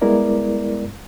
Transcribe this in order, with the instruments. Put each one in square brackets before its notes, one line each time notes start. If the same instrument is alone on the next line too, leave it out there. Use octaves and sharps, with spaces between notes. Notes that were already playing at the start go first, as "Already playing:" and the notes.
[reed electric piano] G3 G#3 B3 E4 A#4 D5